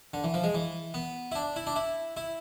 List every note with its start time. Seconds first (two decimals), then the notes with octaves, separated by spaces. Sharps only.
0.14 D3
0.24 E3
0.34 F3
0.44 G#3
0.55 E3
0.94 B3
1.32 E4
1.35 D4
1.56 E4
1.67 D4
1.76 E4
2.17 E4